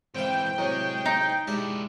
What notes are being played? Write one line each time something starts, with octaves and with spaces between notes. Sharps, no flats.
G#2 E3 C4 F5 G5
A2 C3 F#3 D#5 G#5
D#4
G#3 D4 E4 G4 E5